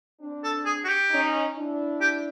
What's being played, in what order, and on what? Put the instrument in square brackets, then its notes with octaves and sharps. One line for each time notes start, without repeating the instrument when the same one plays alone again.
[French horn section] C4 D4
[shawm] A4
G#4
F#4
G4
[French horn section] C#4 D#4
D4 E4
[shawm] G4